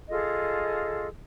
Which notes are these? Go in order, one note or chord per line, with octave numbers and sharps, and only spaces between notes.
F4 G#4 A4 D#5